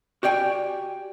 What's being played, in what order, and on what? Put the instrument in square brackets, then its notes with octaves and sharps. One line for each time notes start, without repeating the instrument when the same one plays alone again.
[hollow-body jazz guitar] F#4 G4 D5 G5 G#5